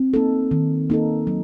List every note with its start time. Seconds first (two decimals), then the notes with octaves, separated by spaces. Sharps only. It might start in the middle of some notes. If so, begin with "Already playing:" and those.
Already playing: C4
0.14 A#3 D#4 A4
0.51 D#3
0.90 A#3 D#4 A4
1.27 F#3